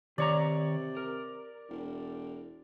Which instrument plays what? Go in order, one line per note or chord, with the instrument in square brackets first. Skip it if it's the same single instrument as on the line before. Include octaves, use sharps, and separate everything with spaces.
[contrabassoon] C3 [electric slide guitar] D#3 C#5 A#5 [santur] D5
[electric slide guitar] A#4
[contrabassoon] E1